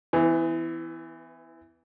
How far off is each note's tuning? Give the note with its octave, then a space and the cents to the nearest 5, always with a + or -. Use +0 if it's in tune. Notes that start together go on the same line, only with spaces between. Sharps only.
E3 +0 B3 +40